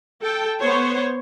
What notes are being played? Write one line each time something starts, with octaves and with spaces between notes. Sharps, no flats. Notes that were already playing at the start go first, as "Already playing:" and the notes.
A4 G5
B3 C5 C#5